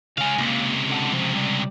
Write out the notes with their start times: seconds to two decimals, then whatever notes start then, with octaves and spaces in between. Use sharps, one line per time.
0.18 C#3 G#3 F5 G#5
0.38 C#2 C3 A#3
0.90 D3 F#5 A5
1.12 F3
1.35 G3